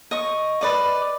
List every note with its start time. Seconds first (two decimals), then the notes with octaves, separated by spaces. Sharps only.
0.11 D#5 C#6
0.61 B4 D5 D#5